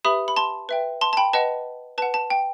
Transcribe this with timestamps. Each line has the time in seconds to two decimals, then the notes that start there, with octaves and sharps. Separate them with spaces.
0.05 G4 B4 E5 B5 D#6
0.28 B5
0.36 A5 C6
0.69 B4 E5 G5
1.01 A5 C6
1.13 A5
1.17 G5 B5
1.33 B4 D#5 F#5 A5
1.98 B4 F#5 A5
2.14 A5
2.30 G5